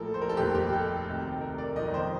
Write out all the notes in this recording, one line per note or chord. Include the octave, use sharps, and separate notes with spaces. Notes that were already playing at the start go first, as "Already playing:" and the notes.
Already playing: A#1 A2 F3 A4 A#4
C5
A#4
A4
F1 D#2 D#3 G4
G4
A4
D2 C3 D#3
A#4
D5
G1 F2 D#3 D#5
C5